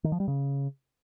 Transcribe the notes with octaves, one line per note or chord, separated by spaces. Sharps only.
D#3
F3
G3
C#3